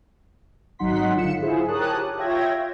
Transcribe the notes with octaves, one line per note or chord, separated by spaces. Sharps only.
G#1 F#3 D#4 F#5 C6 B6
D3 F4 C#7 E7
E4 F4 G#4 C5
G4 A#4 C#5 A5 D#6 F#6
F4 C#5 E5 G5 G#6 A#6